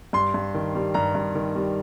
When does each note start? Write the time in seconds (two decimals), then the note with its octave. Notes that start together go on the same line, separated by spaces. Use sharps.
0.13 G2 C6
0.34 G2
0.54 D#3
0.75 G3
0.94 G2 A#5
1.15 G2
1.35 D#3
1.56 G3